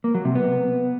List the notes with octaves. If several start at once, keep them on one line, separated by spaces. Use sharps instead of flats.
A#3
F#3
C3
B3